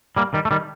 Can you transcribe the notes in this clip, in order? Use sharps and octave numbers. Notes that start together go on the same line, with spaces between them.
G3 A#3
D#3 G3
A3
D#3 G3